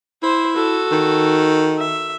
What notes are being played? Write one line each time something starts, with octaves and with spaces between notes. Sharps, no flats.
E4 C5
F#4 A4
D#3
E5